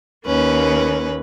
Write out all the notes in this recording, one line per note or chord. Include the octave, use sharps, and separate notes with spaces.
D#2 A#3 C#4 B4